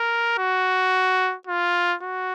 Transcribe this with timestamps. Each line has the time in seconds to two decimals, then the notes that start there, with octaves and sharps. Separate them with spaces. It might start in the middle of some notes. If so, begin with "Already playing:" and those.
Already playing: A#4
0.38 F#4
1.47 F4
2.02 F#4